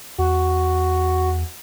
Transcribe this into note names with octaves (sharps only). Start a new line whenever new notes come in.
E2 F#4